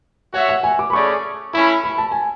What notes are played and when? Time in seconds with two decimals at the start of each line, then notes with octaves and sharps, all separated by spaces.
0.33 F#4 C#5 E5 F#5
0.49 F#5
0.63 G#5
0.79 D6
0.90 B5
0.93 A3 C#4 G#4 D5 C#6
1.54 A3 C#4 E4 B5
1.84 B5
1.98 A5
2.12 G#5